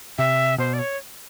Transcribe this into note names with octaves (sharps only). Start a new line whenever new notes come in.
C3 E5
B2 C5
D5
C#5